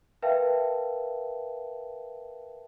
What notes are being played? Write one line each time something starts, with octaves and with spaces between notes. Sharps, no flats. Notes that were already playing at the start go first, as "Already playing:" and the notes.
A#4 B4 E5 F5 G5 A5